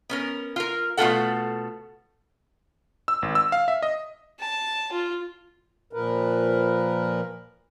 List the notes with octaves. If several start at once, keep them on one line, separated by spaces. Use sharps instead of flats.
B3 C#4 A#4
F4 A#4
B2 A3 E4 F4 A4 F#5
E6
G#1
E6
F5
E5
D#5
A5
F4
A#2 F3 A#4 B4